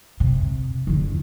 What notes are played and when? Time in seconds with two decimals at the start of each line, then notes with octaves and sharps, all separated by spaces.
0.20 C3
0.87 E2 D3